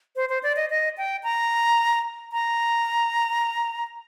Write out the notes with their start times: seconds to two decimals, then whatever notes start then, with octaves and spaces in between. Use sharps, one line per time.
0.16 C5
0.29 C5
0.43 D5
0.56 D#5
0.70 D#5
0.98 G5
1.24 A#5
2.32 A#5